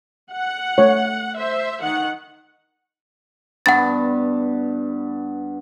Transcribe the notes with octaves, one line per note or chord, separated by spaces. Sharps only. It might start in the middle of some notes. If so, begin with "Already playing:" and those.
F#5
A3 C#5
C5 E5
D#3 F#5
G2 B3 F#5 A5 A6